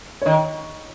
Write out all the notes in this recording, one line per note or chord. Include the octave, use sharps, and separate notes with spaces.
C#5
D#3 D#5